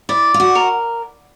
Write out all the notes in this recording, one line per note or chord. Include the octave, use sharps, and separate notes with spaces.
E4 D5
F4
F#4
A#4